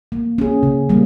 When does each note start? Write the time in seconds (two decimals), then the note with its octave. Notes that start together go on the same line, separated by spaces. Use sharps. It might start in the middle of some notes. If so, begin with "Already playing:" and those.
0.12 A#3
0.38 C#4 G#4
0.63 C#3
0.89 G3 A#3